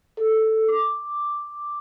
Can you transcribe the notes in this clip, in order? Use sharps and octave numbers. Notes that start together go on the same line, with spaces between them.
A4
D6